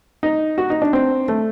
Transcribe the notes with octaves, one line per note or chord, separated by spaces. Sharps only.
D#4
F#4
D#4
D4
C4
A3